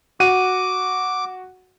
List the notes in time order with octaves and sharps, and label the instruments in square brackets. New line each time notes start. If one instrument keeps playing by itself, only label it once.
[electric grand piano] F#4 F#5 D#7 [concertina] D6